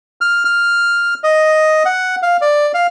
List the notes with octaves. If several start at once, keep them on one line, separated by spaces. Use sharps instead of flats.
F6
F6
D#5
F#5
F5
D5
F5